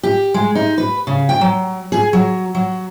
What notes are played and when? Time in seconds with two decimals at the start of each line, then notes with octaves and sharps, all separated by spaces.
0.03 G4
0.34 G#3
0.55 D#4
0.78 B4
1.07 C#3
1.29 G5
1.41 F#3
1.92 G#4
2.13 F#3
2.55 F#3